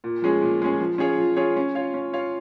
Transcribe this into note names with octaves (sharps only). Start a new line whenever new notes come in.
A#2
F3 G#3 C#4 G#4
A#2
F3 G#3 C#4 G#4
F3
C#4 F4 G#4 C#5
F3
C#4 F4 G#4 C#5
C#4
F4 C#5 F5
C#4
F4 C#5 F5